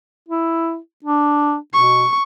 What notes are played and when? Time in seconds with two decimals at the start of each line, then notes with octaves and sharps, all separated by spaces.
0.29 E4
1.04 D4
1.74 B2 C#6